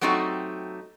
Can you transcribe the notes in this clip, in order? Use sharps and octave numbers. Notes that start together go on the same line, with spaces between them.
F#3 A3 C4 D#4 F#4 G4